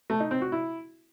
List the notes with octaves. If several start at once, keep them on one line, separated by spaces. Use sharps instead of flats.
A3
D#4
C4
F#4
E4